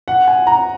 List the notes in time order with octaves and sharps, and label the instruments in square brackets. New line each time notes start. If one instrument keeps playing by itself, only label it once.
[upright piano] F#5
G#5
A#5